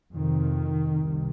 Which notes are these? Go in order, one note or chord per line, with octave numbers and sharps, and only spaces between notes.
F2 C3 D#3
C2 C3